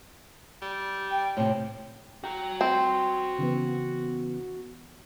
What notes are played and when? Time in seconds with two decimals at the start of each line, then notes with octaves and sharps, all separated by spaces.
0.62 G3
1.10 G5
1.37 A2 C3 F3
2.24 F#4 G5 A#5
2.61 C4
3.39 C#3 E3 B3